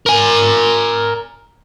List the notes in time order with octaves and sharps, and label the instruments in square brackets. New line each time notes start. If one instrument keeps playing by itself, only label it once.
[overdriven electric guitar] A#4 G#5